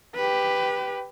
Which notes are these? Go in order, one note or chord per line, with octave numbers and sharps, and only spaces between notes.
G4 B4